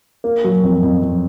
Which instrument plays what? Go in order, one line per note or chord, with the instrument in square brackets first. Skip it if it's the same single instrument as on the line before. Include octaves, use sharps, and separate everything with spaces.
[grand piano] A#3
F#3
F2
F2
F2